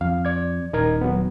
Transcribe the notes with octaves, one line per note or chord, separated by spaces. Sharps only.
F2 F5
D5 G#6
D#1 D#4 A#4 G#6
F#3 B3